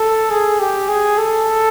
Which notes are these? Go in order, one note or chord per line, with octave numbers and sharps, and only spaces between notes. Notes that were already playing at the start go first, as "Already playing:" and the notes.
Already playing: A4
G#4
G4
G#4
A4